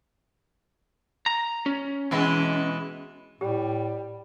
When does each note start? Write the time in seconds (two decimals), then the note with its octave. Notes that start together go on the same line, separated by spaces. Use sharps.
1.26 A#5
1.66 C#4
2.11 B2 E3 G#3
3.41 A2 G3 G4